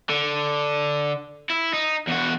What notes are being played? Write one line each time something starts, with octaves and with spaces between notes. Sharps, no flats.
D3
E4
D#4
E2 F#4